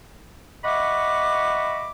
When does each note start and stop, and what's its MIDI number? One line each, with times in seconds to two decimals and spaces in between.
0.64 1.91 75
0.64 1.91 76
0.64 1.91 78
0.64 1.91 83
0.64 1.91 85
0.64 1.91 86